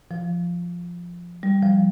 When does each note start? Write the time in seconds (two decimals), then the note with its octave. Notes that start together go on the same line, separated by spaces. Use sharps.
0.11 F3
1.43 G3
1.62 F3